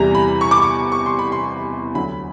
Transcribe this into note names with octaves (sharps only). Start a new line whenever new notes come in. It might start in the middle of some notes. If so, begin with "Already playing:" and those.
Already playing: E2 C3 E3 G3 A#5
B5
C#6
D6
C#6
C#6
C6
B5
C6
D2 D3 F#3 B5